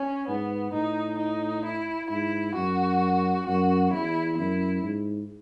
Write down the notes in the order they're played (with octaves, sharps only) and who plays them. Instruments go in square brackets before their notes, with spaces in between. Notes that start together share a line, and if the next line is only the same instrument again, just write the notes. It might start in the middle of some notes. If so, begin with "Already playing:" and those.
Already playing: [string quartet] C#4
[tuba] G#2 [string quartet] B3
[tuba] A2 [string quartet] D#4
[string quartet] D#4
E4
[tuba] G#2 [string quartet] E4
[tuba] F#2 [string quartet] F#4
[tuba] F#2 [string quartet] F#4
[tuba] E2 [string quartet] E4
[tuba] F#2 [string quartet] E4
[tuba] G#2